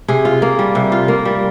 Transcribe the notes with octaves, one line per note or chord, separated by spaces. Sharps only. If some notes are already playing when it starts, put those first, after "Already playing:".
C3 G#4
F4
A#3
G3
C3
F4
A#3
G3